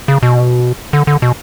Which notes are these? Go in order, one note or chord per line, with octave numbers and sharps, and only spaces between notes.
C#3
B2
D3
D3
B2